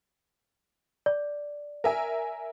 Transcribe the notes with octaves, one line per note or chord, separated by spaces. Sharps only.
D5
A#4 E5 G#5